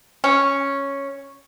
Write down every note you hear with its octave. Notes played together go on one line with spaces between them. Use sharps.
C#4